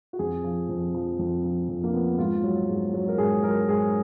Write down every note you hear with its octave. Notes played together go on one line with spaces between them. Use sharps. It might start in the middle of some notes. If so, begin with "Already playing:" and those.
F#4
F2 G#4
F3
F2
F3
F2
F3
F2
A#3
F3 B3
G#2 F4
F#3
G#2
F#3
A#4
G#2 G#4
F#3 A#4
G#2 G#4